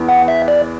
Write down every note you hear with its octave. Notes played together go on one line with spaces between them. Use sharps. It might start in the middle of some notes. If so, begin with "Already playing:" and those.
Already playing: E2 E3 B3
F#5
E5
D5